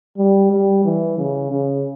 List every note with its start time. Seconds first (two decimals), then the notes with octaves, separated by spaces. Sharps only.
0.18 G3
0.51 G3
0.85 E3
1.18 C#3
1.51 C#3